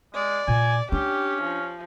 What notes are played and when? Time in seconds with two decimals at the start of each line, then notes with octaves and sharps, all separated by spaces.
0.15 G#3 D5
0.48 A#2 G#5
0.92 C#4 D4 G4
1.43 F3